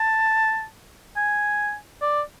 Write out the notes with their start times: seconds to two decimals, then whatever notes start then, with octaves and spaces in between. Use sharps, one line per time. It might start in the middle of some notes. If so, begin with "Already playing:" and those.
Already playing: A5
1.16 G#5
2.01 D5